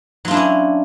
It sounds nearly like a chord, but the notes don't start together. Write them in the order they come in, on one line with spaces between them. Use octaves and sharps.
F#3 F4 D4 E4 C#4